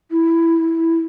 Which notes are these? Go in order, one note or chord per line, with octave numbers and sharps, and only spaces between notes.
E4